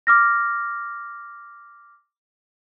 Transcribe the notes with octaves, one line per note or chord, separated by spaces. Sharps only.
D6 F6 A#6